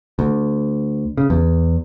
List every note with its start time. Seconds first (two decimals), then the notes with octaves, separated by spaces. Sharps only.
0.19 D2
1.17 C#3
1.30 E2